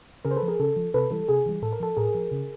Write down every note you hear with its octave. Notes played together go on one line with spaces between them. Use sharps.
C#3 G#4 A#4
C5
A4 B4
F3
G#4 A#4
C#3 A4
F3
C3 A4 B4
E3 G3 A4
C3 G#4
E3 G3
A2 A4
A#4
F3 A4
A2 G#4 A#4
F3
C#3